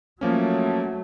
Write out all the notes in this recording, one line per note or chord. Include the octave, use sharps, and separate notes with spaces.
F3 F#3 A3 A#3 C#4